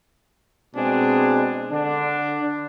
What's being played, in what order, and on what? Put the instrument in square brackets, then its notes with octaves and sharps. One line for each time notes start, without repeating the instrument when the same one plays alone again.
[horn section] B2 G#3 C4 D4 G#4
D3 D4